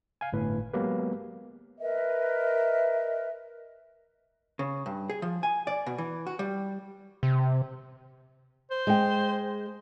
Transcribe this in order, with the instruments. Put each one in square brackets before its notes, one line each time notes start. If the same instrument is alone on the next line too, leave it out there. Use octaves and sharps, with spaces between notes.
[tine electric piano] F5 G#5
G1 A2 B4
F#3 G#3 A#3 B3 G4 B4
[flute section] A#4 B4 D#5 E5
[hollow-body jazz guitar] C#3
G2
G#4
F3
G#5
D5
B2
E3
F#4
G3
[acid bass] C3
[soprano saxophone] C5
[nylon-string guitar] G#3 G5